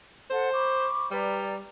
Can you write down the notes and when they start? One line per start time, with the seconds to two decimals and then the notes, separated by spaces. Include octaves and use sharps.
0.30 A4 C5 F#5 A5
0.53 B5 C#6 D6
1.11 G3 B4 D5 A#5